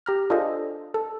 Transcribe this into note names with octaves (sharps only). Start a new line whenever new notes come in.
G4 A#5 F6
D4 F4 G#4 A4 C5 D#5
A4